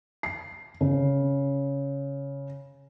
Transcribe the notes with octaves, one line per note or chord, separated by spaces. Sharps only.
C7
C#3